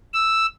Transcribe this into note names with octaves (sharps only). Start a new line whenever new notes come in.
E6